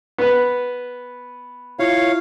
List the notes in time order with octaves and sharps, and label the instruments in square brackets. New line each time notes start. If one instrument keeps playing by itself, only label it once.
[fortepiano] B3 B4
[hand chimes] E4 F4 [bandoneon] C#5 F5